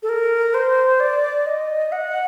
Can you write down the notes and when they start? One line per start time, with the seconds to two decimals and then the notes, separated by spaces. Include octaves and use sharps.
0.03 A4
0.09 A#4
0.54 C5
1.00 D5
1.46 D#5
1.92 F#5